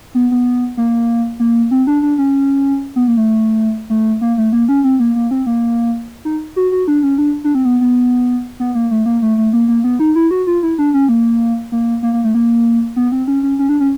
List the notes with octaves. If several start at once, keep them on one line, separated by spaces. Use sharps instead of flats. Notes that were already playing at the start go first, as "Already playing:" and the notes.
B3
B3
A#3
A#3
C4
D4
D4
C#4
B3
A#3
A3
A3
A#3
A3
A#3
C#4
C4
A#3
A#3
C4
A#3
D#4
F#4
F#4
D4
C#4
D4
D4
C4
B3
B3
B3
A#3
A3
A#3
A3
A3
A#3
A#3
B3
D#4
E4
F#4
F4
E4
D4
C#4
A#3
A#3
A#3
A#3
A3
A#3
B3
C4
C#4
C#4
C#4
D4
C#4